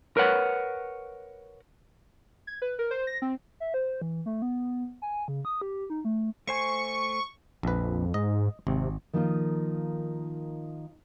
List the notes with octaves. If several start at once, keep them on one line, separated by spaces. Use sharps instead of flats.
A#4 B4 C#5 F#5
G#6
B4
A#4
C5
A#6
C4
E5
C5
E3
A3
B3
G#5
C#3
D#6
G4
D#4
A3
A3 C5 G#5 C#6
A#1 F2 B4
G#2 D#5
G#1 C3
D#3 F3 A#3 D#4 F4